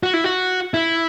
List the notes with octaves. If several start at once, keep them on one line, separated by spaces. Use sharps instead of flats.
F#4
E4
F#4
E4